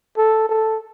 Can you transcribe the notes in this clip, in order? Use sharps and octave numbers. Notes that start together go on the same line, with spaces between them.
A4
A4